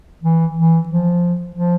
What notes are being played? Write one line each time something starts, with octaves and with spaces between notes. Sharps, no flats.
E3
E3
F3
F3